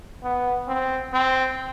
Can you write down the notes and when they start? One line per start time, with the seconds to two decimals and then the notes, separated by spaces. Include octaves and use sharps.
0.23 B3
0.68 C4
1.13 C4